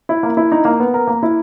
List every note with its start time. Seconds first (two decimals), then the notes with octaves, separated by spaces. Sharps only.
0.09 E4
0.23 A#3
0.37 E4
0.52 D#4
0.65 A#3
0.80 B3
0.94 A#4
1.07 A#3
1.23 E4